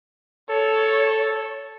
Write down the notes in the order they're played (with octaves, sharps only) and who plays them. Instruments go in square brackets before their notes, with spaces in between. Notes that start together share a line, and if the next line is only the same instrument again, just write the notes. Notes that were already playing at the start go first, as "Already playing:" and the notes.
[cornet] A4 [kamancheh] C#5